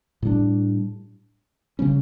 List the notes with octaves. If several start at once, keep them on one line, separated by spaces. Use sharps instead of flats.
A2 G3 D4
C#3 G3 C#4